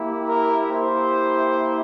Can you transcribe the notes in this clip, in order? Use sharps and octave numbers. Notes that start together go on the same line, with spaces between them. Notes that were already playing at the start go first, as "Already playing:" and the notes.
Already playing: A#3 E4 G4
A#4
A#3 E4 G4 C5